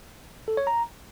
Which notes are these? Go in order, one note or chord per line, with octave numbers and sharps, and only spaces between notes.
A4
C#5
A#5